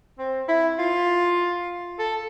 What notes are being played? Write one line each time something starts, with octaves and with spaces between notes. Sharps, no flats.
C4
E4
F4
A4